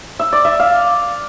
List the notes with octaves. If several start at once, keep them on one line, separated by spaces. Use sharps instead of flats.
E5
D5
E5
F5